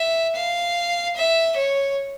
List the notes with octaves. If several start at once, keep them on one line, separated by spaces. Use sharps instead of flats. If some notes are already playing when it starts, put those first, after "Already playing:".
Already playing: E5
F5
E5
C#5